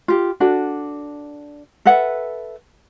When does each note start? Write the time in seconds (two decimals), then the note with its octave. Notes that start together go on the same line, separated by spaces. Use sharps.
0.08 F4 G4
0.40 D4 F#4 A4
1.85 A4 B4 E5 F#5